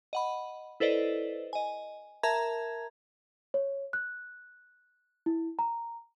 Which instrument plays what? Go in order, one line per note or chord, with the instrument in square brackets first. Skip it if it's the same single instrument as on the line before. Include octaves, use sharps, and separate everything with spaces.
[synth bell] D#5 F#5 B5
E4 A4 B4 C5 D5 D#5
D#5 G#5
A#4 E5 A5 A#5 G#6
[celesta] C#5
F#6
E4
A#5